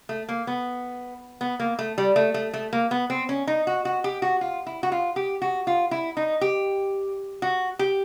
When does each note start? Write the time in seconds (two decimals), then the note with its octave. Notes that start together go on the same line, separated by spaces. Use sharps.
0.09 A3
0.29 A#3
0.47 B3
1.41 B3
1.60 A#3
1.79 A3
1.98 G3
2.16 A3
2.34 A3
2.54 A3
2.73 A#3
2.91 B3
3.10 C4
3.29 C#4
3.47 D#4
3.67 F#4
3.85 F#4
4.04 G4
4.22 F#4
4.41 F4
4.66 E4
4.83 F#4
4.92 F4
5.16 G4
5.42 F#4
5.67 F4
5.91 E4
6.17 D#4
6.41 G4
7.42 F#4
7.79 G4